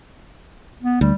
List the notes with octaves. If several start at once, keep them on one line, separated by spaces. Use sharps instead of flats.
B3
D2 G3